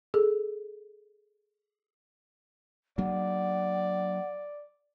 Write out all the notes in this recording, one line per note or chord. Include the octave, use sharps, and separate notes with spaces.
G#4 A4
F#3 A#3 D4 D5 F#5